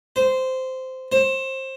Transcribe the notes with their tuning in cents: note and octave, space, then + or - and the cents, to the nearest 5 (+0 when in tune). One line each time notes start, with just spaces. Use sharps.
C5 -10
C5 +25